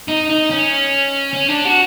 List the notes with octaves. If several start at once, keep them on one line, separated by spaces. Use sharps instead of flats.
D#4
D#4
C#4
C#4
D4
F#4